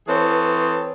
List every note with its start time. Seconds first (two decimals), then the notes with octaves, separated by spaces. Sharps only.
0.07 E3 C4 G#4 A4 B4 C#5